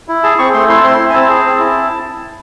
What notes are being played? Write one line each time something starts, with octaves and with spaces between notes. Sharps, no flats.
E4
G#4 A5
C4 C#6
A3 C6
E4 C6
A5
C4 C6
E4
G#5
C4 A5
G#4
C4
E4